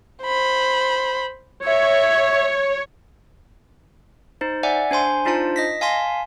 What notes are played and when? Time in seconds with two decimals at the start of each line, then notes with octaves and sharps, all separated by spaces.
0.24 C5 B5
1.65 C#5 E5
4.41 D#4 C5
4.63 D5 E5 F#5 G#5
4.91 D4 C5 G#5 C6
5.25 D4 D#4 F4 C5 A5
5.56 D#5 A#6 B6
5.81 F5 G#5 A5 C6 B6